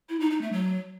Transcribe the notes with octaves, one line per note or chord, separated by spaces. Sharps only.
E4
D#4
D#4
A3
F#3